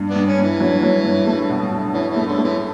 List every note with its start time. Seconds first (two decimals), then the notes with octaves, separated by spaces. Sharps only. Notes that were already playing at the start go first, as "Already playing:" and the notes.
Already playing: G2
0.10 B3 D4
0.16 G2
0.27 C#4
0.38 G2
0.43 E3
0.60 F#3
0.83 F#3
1.04 G2
1.27 A3
1.49 B2
1.71 B2
1.94 E3 C#4
2.11 E3
2.16 A3
2.27 D3
2.38 A3
2.44 E3